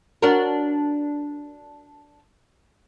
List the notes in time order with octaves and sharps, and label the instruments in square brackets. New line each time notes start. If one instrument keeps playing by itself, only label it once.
[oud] D4 F#4 A#4